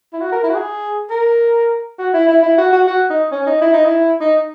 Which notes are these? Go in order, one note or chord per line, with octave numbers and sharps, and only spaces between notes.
E4
F#4
A#4
E4
F#4
G#4
A#4
F#4
E4
E4
E4
F#4
F#4
F#4
D#4
C#4
D#4
E4
D#4
E4
D#4